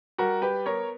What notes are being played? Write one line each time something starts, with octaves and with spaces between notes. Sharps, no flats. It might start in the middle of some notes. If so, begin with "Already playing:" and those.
G3 F#4 A#4
G4 B4
B3 A#4 C#5